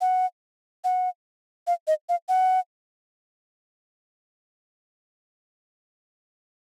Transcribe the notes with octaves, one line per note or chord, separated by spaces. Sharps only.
F#5
F#5
F5
D#5
F5
F#5